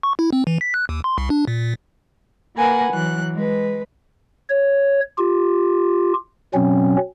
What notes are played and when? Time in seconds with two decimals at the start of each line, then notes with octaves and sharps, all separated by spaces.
0.03 C#6
0.19 E4
0.33 C4
0.47 E3
0.61 B6
0.74 F#6
0.89 D#2
1.04 C6
1.18 C2
1.30 D4
1.47 A#2
1.61 A#2
2.56 A#3 A#4 B4 F#5 G#5
2.91 E3 F#3 F#6
3.35 G#3 B4
4.49 C#5
5.18 F4 G4
6.54 B2 F#3 C4 C#4